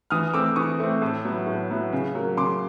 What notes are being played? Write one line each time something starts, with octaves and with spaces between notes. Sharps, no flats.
E3 D#6 F6
A3 C4 D6 E6
E3 C#6 D#6
A3 C4
A2
F#3 B3 E4
A2
F#3 B3 E4
C#3
F#3 A#3
C#3 C6 D6